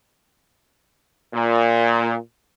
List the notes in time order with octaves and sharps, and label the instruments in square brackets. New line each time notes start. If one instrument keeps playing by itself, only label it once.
[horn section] A#2